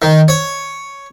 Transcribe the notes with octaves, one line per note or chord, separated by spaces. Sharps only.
D#3
C#5